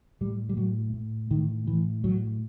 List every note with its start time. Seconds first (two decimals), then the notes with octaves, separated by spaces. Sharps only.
0.21 A2 G3
0.49 G3
0.57 A2 F#3
0.93 A2
1.31 A2 D#3
1.67 A2 E3
2.04 A2 F#3